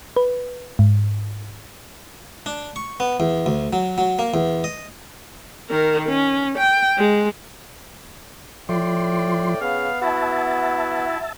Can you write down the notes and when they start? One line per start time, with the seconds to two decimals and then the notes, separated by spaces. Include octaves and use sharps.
0.16 B4
0.79 G#2
2.46 D4
2.76 C#6
3.00 B3
3.20 E2
3.46 D2
3.73 F#3
3.98 F#3
4.19 A#3
4.34 E2
4.64 D#5
5.70 D#3 A#4
6.09 C#4
6.58 G5
6.98 G#3
8.69 A2 F3 D5 G5 C6
9.61 C#3 B3 F5
10.02 E4 F#4 E5 A5